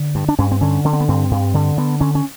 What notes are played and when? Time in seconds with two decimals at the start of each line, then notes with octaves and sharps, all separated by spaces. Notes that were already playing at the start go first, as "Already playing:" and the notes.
Already playing: D3
0.15 G2
0.29 D4
0.39 G2 C#4
0.51 C4
0.61 D3 C#4
0.85 D3 C#4
0.93 C4
1.00 B3
1.08 G2 C4
1.31 G2
1.54 D3
1.77 D3 B3
2.01 D3 C#4
2.15 C#4